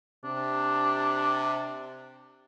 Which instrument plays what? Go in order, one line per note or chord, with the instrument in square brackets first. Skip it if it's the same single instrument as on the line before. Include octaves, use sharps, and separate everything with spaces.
[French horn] C3 [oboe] D4